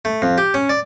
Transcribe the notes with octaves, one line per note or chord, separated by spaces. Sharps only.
A3
F2
G4
C#4
D5